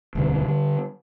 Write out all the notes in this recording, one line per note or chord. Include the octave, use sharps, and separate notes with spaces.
E1 D2 D3 G3
D3 G3